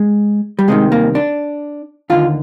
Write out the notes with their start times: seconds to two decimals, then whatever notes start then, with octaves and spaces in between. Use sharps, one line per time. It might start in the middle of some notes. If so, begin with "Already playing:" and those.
Already playing: G#3
0.59 G3
0.68 C2 C3 D#3 G#3
0.92 A#3
1.15 D4
2.10 D#2 D3 F4